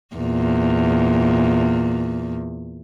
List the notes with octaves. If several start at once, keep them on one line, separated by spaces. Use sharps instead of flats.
E2 A#2